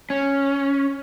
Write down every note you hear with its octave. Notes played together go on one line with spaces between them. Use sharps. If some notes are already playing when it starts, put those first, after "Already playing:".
C#4